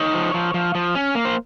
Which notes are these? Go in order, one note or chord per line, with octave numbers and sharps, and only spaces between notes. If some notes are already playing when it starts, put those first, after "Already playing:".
Already playing: D#4 C#5
F3
F3
F3
F3
C#4
A#3
C5